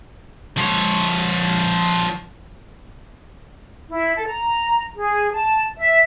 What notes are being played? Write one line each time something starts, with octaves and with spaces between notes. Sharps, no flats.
F3 C#5
E4
A4
A#5
G#4
A5
E5